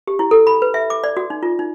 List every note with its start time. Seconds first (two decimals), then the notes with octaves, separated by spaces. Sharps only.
0.07 G4
0.19 E4
0.31 A4
0.47 B5
0.62 B4
0.74 E5
0.90 D6
1.04 D5
1.17 F#4
1.30 D#4
1.43 F4
1.59 D#4